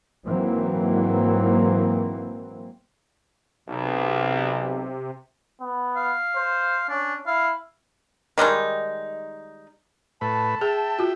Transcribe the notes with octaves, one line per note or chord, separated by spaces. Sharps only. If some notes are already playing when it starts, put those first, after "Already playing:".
G#2 E3 F#3 A#3 C4
B1 C3
B3
F5
C5
C#4 D4
E4 F5
D#3 G3 G#3 D#4
A2 B4 A5
G#4 E5 G5
F4 F#4